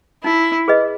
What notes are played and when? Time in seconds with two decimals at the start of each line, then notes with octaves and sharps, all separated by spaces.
0.24 D#4 E4
0.68 G#4 B4 D#5